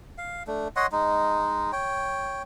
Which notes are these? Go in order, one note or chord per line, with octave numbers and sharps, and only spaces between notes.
F5
A3 D4
C#5 D#5 F#5 C6
G#3 D#4
C#5 G5